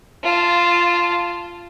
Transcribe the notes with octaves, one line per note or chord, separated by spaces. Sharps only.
F4 A5